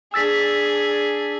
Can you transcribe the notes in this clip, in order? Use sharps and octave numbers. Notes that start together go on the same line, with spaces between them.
D4 G#4 E6 A6 B6